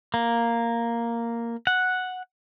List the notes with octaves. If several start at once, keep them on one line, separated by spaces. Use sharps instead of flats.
A#3
F#5